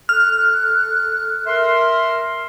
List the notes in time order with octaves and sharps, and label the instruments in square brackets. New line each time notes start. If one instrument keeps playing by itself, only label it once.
[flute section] A4 F#6 [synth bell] F6
[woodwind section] A#4 E5 C6